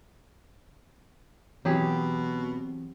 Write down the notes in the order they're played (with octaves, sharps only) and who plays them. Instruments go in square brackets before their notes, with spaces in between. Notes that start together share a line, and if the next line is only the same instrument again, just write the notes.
[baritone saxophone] B2 [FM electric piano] E3 C4 [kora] F#3 G4 G#4